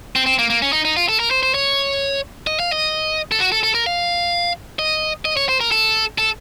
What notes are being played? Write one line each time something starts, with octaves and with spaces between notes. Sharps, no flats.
C4
C4
A#3
A#3
C#4
D#4
D#4
F4
A4
A#4
C5
C5
C#5
D#5
F5
D#5
A4
F#4
A4
A4
A#4
F5
D#5
D#5
C#5
C5
A#4
A4
A4